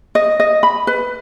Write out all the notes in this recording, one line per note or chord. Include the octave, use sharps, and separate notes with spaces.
D#5
D#5
B5
B4